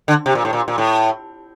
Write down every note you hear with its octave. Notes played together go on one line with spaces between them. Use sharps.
D3
C3
A#2
A2
A#2
A#2
A2